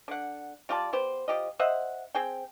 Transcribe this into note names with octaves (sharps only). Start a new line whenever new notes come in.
D3 F#5
G3 F4 D5 A5
B3 G4 C5
F3 G4 D#5
C5 D#5 E5 F#5
C4 G#4 G5